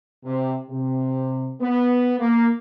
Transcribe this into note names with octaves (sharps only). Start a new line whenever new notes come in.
C3
C3
B3
A#3